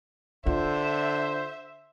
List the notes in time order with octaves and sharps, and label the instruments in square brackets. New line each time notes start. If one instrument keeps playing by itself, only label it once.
[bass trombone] D3 [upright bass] F4 [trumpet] C5 [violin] E5